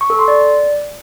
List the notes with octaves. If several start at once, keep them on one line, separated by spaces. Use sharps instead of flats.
C#6
A4
C6
D5